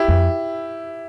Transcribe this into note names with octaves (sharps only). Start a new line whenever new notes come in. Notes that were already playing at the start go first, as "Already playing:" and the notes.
Already playing: E4 G4
F2